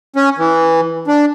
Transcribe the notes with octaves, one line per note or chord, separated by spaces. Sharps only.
C#4
E3
D4